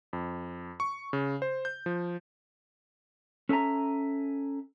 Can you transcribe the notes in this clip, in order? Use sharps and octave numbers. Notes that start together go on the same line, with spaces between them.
F2
C#6
C#3
C5
G6
F3
C#4 A4 E5 G#5 A#5